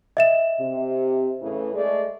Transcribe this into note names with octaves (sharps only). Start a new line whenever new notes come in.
D#5 E5 E7
C3
A2 C#3 E3
G#3 A3 D5